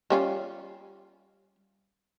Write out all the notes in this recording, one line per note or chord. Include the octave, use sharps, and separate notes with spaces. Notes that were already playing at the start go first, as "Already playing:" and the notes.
G3 C#4 F4